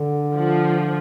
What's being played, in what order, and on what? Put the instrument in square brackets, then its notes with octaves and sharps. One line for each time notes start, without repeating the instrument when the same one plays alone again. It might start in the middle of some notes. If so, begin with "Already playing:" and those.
Already playing: [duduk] D3
[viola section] F3